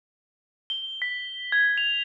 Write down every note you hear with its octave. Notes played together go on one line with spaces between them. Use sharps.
G7
B6
G#6
F7